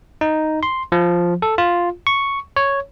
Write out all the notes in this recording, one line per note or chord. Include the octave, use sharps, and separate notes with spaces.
D#4
C6
F3
A4
F4
C#6
C#5